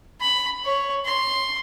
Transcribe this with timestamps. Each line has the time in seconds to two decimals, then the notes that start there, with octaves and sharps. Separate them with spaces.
0.21 B5
0.65 C#5
1.05 C6